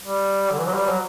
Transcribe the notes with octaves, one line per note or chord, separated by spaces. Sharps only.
G3
D3
E3
F#3
G3
F#3